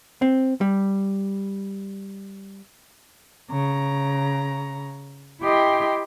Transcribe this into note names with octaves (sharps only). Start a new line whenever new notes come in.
C4
G3
C#3 A#5
E4 G4 D#5 G5 C6